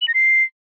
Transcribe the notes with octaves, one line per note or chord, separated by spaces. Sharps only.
F#7
A#6
C7